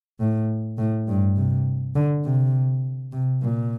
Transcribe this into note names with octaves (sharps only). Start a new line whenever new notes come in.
A2
A2
G2
C3
D3
C3
C3
A#2